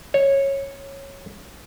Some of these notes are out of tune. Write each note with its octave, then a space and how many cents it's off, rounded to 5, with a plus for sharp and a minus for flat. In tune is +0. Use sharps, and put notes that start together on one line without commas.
C#5 -10